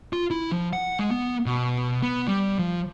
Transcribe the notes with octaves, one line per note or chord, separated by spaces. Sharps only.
F4
E4
F3
F#5
G#3
B3
B2
B3
G3
F3